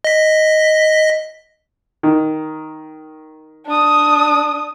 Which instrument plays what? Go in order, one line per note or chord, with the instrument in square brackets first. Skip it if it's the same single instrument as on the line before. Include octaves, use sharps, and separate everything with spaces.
[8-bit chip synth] D#5 B6
[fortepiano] D#3
[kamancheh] D4 D#6